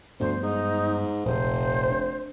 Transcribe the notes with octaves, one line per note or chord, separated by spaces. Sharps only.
D2 G2 F3 B3 C5
G#2 D#4
F1 A#1 F2 C3 C5
D4